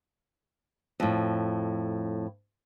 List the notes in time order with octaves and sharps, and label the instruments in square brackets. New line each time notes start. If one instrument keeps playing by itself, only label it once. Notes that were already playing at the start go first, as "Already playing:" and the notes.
[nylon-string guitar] F2 A2